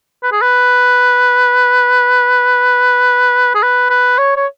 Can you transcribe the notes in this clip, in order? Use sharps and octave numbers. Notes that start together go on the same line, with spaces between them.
B4
G#4
B4
G#4
B4
B4
C#5
C#5